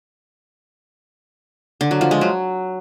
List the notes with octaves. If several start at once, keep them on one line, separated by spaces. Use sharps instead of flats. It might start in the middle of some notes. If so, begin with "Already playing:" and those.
D3
F#3
F3
G#3
F#3